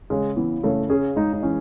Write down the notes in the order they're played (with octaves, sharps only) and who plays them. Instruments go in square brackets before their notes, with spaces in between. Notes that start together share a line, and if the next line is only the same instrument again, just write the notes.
[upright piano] C#3 [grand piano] G#3
[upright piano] E3 [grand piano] B3
[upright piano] C#3 [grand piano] A3
[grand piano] C#4 [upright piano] G#4
[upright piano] G#3 [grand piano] D#4
[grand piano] D#4
[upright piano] E3 [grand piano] C#4